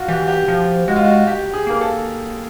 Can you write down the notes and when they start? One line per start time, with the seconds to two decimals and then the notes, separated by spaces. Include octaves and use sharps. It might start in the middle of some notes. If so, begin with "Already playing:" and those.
Already playing: F4 F#4
0.08 E3 G4
0.28 G4
0.48 F3 F4
0.88 G#3 F#4
0.96 F4
1.04 F#4
1.27 G4
1.54 G#4
1.67 A#3 A#4
1.81 A4